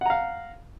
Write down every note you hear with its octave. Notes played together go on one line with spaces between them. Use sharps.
F5 F#5 A#5